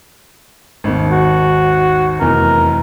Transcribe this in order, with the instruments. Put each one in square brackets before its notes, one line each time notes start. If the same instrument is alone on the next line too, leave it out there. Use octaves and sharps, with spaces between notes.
[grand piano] G#1 D#2
[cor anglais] F#4
[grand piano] F1 E2 [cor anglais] A#4